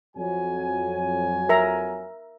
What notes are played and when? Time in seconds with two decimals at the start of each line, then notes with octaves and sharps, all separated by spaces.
0.16 F2 F#3 G#5
1.49 A#4 E5 A#5